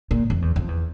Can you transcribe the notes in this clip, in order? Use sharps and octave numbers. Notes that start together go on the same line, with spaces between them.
A#2
F2
E2
F2
E2